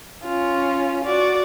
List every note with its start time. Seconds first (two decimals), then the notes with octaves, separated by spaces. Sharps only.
0.24 C#4 F4
1.05 F#4 D5